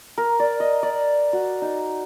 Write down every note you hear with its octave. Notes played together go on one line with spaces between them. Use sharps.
A#4
D5
D#5
D5
F#4
D#4